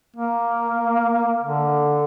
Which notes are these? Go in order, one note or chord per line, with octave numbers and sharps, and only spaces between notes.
A#3
D3